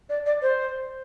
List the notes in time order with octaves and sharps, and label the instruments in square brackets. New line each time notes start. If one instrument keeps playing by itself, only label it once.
[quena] D5
D5
C5